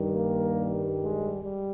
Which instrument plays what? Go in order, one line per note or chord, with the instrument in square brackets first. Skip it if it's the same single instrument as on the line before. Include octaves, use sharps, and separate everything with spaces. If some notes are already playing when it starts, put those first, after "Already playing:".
Already playing: [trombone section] G2 D#3 G3
A#3
G#3
G3